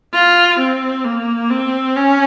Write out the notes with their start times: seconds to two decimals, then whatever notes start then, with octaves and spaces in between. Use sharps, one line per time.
0.13 F4
0.59 C4
1.04 A#3
1.50 C4
1.96 C#4